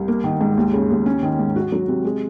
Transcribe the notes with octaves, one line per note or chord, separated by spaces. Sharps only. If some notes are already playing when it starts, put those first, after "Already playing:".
Already playing: C2
A#3
D#3
G#2
D#2
C#3
D#2
C#4
D#3
G#2
F#4
F#3
C3
G#3